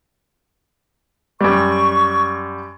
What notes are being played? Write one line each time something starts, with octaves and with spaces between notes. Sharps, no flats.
F#2 G3 C#6